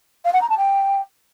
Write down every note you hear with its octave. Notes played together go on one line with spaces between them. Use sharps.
F5
F#5
A#5
A5
G5